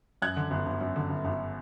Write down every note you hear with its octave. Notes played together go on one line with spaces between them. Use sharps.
F#2 F#6 G#6
D3
G1
G1
F#2
D3
G1
G1